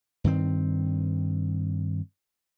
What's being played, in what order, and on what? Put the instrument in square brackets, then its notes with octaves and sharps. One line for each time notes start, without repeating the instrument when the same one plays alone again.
[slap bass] G2 D#3 C4